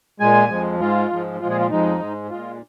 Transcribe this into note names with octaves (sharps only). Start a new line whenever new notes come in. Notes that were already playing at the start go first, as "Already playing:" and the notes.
A#2 G#3 G#5
F2 F3 G#3
G#2 G#3 F4
G#2 F3 G#3
A#2 F3 G#3 F4
G#4
F4
F2 F3 G#3 D#4
G#2 G#3
A#2 G#3 F4